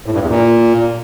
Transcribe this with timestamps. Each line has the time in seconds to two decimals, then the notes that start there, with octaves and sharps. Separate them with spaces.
0.06 A2
0.14 G2
0.22 E2
0.29 A#2